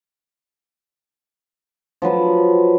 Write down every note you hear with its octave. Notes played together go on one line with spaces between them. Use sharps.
F3 F#3 B4 A5